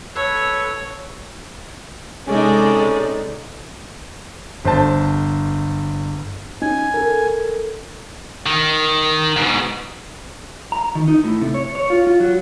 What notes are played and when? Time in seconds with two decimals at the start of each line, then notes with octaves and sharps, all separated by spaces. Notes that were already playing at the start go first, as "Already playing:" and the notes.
0.15 A4 B4 C#5
2.27 C3 G#3 C#4 D#4 A4 D5
4.65 G1 C5 A5
6.62 C#4 D#4 G#5
6.94 A4 A#4
8.46 D#3
9.36 G#2 B2
10.72 A#5
10.95 D#3
11.08 D#4
11.24 A2
11.41 C3
11.54 C#5
11.75 C#5
11.90 F4
12.07 F4
12.20 F#3